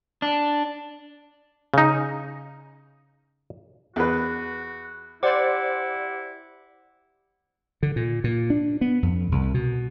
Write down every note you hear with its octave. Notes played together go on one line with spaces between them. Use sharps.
D4
C#3 D#4
E2 F#4 B4
E4 G4 C5 D5 F#5 D6
D3
A#2
A#2
D4
B3
F2
C2
B2